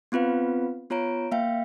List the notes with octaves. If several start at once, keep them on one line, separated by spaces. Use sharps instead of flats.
B3 C4 F4 B4 F5
B3 F4 C#5 A#5 D7
A#3 E5 F5 G5